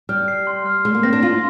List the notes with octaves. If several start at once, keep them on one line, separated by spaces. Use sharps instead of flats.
G3 F6
C7
C6
F6
G#3 C6
A#3
C4 A#6
D4
F4 C6